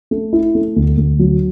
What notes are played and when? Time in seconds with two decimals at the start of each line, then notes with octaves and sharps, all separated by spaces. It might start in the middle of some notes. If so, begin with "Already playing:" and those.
0.11 A3
0.33 E4
0.55 A3
0.76 D2
0.97 D2
1.19 F#3